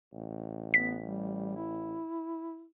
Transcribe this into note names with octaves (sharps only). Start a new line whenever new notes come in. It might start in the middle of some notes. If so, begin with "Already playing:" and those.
A1
B3 B6
G3
E4